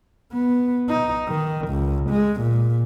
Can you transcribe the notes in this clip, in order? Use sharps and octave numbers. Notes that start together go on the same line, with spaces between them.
B3
D#4
D#3
C#2
G#3
A#2